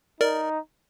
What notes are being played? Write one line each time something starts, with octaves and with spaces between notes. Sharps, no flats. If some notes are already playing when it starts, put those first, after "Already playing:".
D#4 A#4 D5